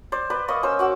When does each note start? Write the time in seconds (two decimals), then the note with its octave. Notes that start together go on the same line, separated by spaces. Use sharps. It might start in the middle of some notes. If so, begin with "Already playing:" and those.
0.12 C5 D5
0.30 B4 D5
0.48 A#3 D#5 C#6 D#6
0.63 C#4 C5 C#6 E6
0.79 F#4 F#5 D6 E6